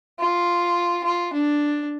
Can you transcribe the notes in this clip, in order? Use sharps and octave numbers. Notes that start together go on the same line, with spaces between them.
F4
F4
D4